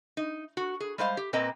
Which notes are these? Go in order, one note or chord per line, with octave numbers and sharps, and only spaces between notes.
D#4
F#4
G#4
G3 G#3 C5 F5
G4
A#2 A#3 C4 B4 D#5 A#5